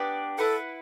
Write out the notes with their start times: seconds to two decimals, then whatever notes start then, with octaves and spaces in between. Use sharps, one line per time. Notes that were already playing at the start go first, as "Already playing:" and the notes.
Already playing: B3 D4 G4 B4 D5
0.38 E4 A4 B4 F#5